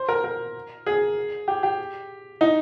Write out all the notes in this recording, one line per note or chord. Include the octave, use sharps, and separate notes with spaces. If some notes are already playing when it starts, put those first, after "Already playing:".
Already playing: C5
A#4
A#4
G#4
G4
G4
D#4